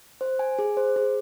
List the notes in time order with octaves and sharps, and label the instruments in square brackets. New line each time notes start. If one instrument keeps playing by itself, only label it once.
[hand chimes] C5
G#5
G#4
C5
G#4